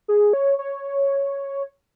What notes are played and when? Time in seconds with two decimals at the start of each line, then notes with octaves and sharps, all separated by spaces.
0.08 G#4
0.33 C#5
0.59 C#5